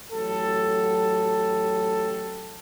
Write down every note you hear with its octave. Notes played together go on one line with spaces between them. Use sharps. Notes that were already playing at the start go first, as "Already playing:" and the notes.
A1 F#3 G4 A4